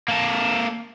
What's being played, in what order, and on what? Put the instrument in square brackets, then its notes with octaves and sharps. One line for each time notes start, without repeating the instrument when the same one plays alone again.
[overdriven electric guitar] A#3 A4